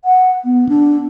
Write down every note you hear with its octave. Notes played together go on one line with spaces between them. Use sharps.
F#5
B3
D4